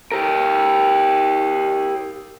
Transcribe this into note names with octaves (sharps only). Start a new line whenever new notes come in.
G4 A#4